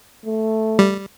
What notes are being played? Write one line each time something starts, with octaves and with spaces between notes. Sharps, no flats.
A3
G3